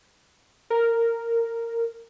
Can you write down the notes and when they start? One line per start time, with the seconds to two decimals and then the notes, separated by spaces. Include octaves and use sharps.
0.70 A#4